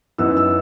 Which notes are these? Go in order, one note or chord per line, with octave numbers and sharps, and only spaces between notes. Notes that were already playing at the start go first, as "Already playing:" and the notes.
F#2 E3 B3 D#4 E6
E6